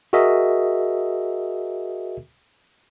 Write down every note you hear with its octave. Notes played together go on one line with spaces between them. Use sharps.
F#4 G#4 A#4 D#5 E5